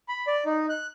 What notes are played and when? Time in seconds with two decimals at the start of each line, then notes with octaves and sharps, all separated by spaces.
0.09 B5
0.27 D5
0.46 D#4
0.70 F#6